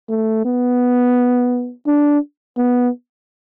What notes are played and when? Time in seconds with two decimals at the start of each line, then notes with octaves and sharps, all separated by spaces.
0.09 A3
0.45 B3
1.87 D4
2.57 B3